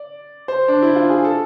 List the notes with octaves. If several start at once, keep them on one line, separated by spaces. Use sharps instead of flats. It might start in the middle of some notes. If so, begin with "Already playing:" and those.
Already playing: D5
C5
D4
E4
F4
G#4
A4